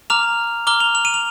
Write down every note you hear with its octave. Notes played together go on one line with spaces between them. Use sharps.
A#5 D6 F6 F7
A#5 D6 F6 G7
F7
F7
D#7
F7